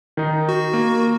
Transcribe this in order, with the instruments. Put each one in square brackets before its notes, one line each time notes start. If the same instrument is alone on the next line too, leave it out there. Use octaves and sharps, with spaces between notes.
[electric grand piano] D#3 D#4
[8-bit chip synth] F#4
[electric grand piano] A#3